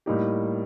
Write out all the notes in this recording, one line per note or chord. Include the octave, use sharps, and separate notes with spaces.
A2 G3 A#3 D#4 G4